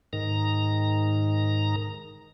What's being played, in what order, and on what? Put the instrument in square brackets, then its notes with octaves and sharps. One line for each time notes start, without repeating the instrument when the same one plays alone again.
[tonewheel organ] G#2 D#3 A#5